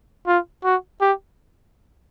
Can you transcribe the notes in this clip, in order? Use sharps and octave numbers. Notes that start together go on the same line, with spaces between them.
F4
F#4
G4